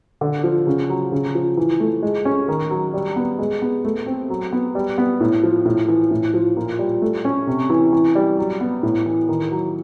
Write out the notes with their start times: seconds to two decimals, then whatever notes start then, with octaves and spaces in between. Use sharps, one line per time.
0.21 D3
0.44 F3
0.67 C#3
0.90 F#3
1.12 C#3
1.35 F3
1.57 E3
1.80 A3
2.02 G#3
2.25 C#4
2.48 D#3
2.71 F#3
2.94 G3
3.16 B3
3.39 G#3
3.62 B3
3.85 A3
4.06 C4
4.30 F#3
4.52 B3
4.75 G3
4.98 B3
5.21 A2
5.43 F3
5.66 A2
5.88 E3
6.11 A2
6.34 F3
6.57 A#2
6.79 G3
7.02 A3
7.25 C#4
7.47 C3
7.70 E3
7.93 E3
8.15 G3
8.38 F#3
8.61 B3
8.83 A2
9.06 E3
9.29 D#3
9.51 F#3